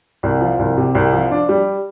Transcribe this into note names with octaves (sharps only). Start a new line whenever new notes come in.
C2
F3
C2
C3
C2
F3
D4
G3